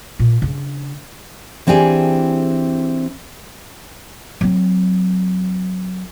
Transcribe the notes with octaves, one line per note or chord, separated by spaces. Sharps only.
A#2
C#3 D4
E3 C4 D4 G4 G#4
F#3 C4